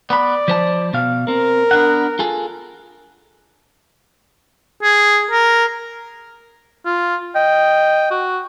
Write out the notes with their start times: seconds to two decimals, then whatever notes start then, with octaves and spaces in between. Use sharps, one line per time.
0.10 B3 D5 B5
0.48 F3 C5 A5
0.93 B2 F5
1.28 C4 A#4
1.71 B3 D4 F#5
2.19 F4 G#4 A4
4.83 G#4
5.31 A#4
6.85 F4
7.35 D#5 G5
8.11 F#4